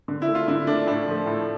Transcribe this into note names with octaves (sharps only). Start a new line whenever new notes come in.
D3
E4
A3
F4
D3 E4
A3 D4
A2 D4
F3 A3
A2